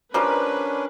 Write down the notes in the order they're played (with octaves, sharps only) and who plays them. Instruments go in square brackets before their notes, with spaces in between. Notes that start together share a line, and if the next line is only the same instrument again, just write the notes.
[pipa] F3 G3 [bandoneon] C#4 D4 [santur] A#4 C6 [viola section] B4